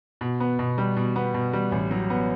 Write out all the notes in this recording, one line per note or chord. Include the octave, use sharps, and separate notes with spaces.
B2
B3
B2
G3
B2
B3
B2
G3
A1
F#3
B3